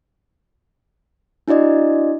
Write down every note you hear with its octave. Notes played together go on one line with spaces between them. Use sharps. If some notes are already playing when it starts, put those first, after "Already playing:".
D4 E4 F#4 D5 D#5